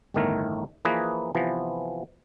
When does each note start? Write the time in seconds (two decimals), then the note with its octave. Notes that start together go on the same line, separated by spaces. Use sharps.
0.14 G1 E2 A2 D#3 A3 A#4
0.85 E3 F3 A#3 G#4 B4 D#5
1.35 C3 E3 F3 B3